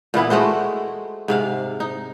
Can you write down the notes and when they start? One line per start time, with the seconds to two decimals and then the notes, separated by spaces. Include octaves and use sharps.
0.14 A#2 E3 B3 E4
0.30 G#3 A3 F#4 C5
1.28 G#2 C3 F5
1.80 D#4